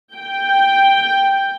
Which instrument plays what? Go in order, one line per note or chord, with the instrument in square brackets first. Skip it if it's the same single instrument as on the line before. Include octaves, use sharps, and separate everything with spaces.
[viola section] G5